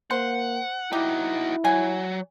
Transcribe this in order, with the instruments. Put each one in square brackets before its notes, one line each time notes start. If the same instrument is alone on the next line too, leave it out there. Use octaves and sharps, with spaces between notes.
[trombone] A#3 [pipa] C5 [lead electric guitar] F#5
[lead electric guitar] D#4 F#4 [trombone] E4 [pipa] G4
[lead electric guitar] F#3 [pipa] G#5